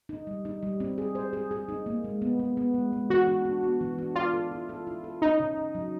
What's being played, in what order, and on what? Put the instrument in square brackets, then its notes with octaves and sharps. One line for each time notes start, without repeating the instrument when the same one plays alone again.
[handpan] D#4
G3
D#4
G3
C4
G#4
C5
G#4
G#4
D#4
A#3
G#3
B3
B3
B3
G#3
G#3
[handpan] E3 [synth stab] F#4
[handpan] D4
D4
B3
E3
D4
[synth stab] F4 [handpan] D5
[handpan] A4
E4
A4
E4
A4
[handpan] C#4 [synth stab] D#4
[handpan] C#3
C#3
F#3